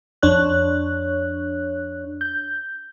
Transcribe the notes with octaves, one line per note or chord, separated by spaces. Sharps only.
F2 D4 C#5 F#6
G6